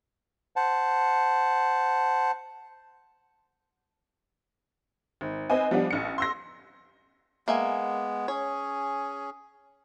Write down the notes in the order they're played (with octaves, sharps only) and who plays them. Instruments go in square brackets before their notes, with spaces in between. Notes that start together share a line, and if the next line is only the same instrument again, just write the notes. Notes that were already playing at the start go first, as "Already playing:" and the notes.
[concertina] C5 F#5 A5
[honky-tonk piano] G#1
C4 B4 D#5 G#5
F3 G3 B3 D4
A1 C#7
C6 E6 A#6
[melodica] G#3 B3 [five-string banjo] A#3 E5 G#5
[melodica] C#4 G#4 [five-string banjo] C#5